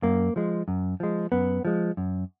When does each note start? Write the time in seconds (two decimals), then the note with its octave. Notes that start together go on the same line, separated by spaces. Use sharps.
0.02 F#2 A#3
0.36 F3 G#3
0.68 F#2
1.00 F3 G#3
1.32 F#2 B3
1.65 F3 G#3
1.97 F#2